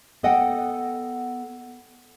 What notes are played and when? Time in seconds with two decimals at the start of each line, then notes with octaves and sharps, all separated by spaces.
0.23 B3 A4 D#5 F#5 G5